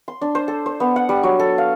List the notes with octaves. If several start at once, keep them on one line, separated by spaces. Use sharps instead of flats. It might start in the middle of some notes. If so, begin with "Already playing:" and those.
C6
D4
C5
A4
C5
B3
F#5
G3
F#3
A4
F5